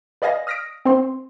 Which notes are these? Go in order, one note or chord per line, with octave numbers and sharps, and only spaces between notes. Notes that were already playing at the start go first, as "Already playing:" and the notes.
B4 D5 D#5 F5 G#5 A#6
D#6 F6 A#6 B6 D7
C4 C5 C6